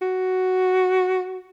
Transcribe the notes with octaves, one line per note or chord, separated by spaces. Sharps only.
F#4